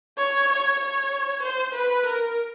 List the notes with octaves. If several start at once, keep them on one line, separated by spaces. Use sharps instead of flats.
C#5
C#5
C#5
C5
B4
A#4